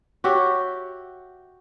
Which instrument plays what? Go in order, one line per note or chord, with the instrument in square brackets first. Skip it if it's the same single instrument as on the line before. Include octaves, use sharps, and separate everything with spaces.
[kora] F#4 G4 C#5 E5